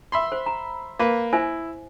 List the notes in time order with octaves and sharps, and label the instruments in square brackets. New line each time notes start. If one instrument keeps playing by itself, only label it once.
[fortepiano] E5 B5 C6
[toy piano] C5
A#5
[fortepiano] A#3 B4
[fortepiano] E4 [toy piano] C5 E5 G#5